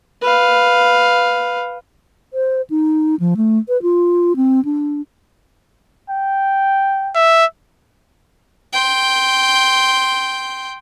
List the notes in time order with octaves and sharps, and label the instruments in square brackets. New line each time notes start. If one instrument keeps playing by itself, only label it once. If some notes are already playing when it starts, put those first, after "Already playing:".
[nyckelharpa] B4 F5
[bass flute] C5
D#4
F3
A3
B4
F4
C4
D4
[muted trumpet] G5
[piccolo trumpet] E5
[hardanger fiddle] G5 C6